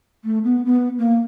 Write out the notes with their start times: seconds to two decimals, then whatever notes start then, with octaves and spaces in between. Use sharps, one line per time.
0.24 A3
0.44 B3
0.65 B3
0.98 A#3